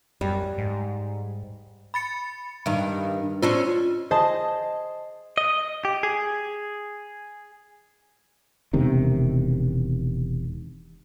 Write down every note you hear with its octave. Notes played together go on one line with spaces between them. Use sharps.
F#2 G3
G#2
B5 A6 C#7
G2 D#3
C#4 D4 F4 C5
G#4 C5 D#5 A5
D#5
G4
G#4
E1 C3 D#3